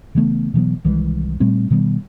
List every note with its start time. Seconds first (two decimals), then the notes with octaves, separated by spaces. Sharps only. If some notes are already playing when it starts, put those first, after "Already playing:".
0.15 C#3 E3 A3 B3
0.54 B2 E3 F#3 B3
0.84 C2 D#3 E3 G#3
1.40 A#2 G3 A3 C4
1.70 B2 D#3 G3 B3